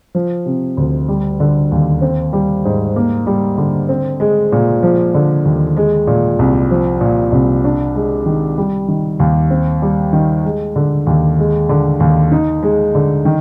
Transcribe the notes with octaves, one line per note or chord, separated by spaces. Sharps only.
F3
C3
D2
G3
D3
D#2
C4
G3
G#2
A#3
G3
D3
C4
G#3
A#2
F3
D3
D#2
G#3
A#2
C2
F3
A#2
C2
D4
G#3
D#3
G3
D#3
D#2
C4
G3
D#3
G#3
D3
D#2
G#3
D3
D#2
D#4
G#3
D3
D#3